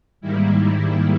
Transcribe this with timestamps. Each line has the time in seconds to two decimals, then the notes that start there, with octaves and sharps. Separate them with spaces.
0.21 G#2 D#3 G3 A#3 E4